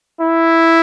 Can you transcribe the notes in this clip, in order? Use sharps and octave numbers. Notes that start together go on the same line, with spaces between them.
E4